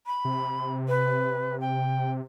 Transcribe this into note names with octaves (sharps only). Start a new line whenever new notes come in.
B5
C3
B4
G5